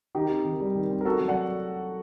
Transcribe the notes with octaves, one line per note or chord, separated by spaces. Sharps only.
D#3 D#4 G4
C4
D#3
G3
D#3
C4
A#4
A3 F#4 A4
F#3
D5 F#5